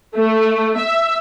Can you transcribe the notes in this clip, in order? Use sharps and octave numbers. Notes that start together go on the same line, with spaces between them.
A3
E5